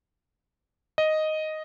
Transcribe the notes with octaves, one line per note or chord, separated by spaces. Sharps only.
D#5